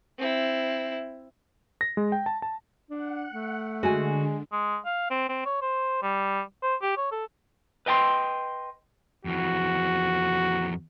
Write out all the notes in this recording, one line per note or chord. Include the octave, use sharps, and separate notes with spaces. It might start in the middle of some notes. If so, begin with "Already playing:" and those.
C4 E4
A#6
G#3
G5
A5
A5
D4 F#5
A3
D3 G#3 F#4 G#5
G#3
F5
C4
C4
C#5
C5
G3
C5
G4
C#5
A4
B4 D#5 G5 A5 C6
F2 E3 F#4